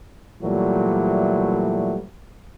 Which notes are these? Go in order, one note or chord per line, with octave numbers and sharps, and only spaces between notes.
A#2 E3 F#3 G3 A3